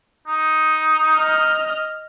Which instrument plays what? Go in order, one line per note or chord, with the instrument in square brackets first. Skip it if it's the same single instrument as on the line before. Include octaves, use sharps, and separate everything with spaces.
[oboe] D#4
[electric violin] D#5 F6